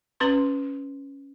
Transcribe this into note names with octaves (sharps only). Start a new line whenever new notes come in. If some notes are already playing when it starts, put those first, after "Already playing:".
C#4 B4 C6